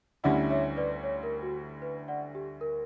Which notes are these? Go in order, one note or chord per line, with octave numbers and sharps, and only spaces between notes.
D2 D3 G3 C#4 E4 D5 F#5
C#5 E5
B4 D5
C#5
A#4
F#4
B4
D5 F#5
G4
A#4